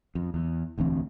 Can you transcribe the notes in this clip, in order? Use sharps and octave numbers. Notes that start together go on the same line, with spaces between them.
F2
E2
E1 D2 E3 C4